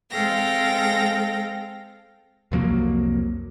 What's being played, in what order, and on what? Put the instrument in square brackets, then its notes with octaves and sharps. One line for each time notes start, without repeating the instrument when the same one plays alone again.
[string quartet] G#3 C4 A4 F5 G5 A#6
[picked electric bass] C2 F2 F#3 A#3